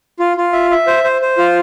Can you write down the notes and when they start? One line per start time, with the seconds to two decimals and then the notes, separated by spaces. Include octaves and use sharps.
0.19 F4
0.37 F4
0.53 E5
0.71 E5
0.87 C5
1.04 C5
1.22 C5
1.38 F4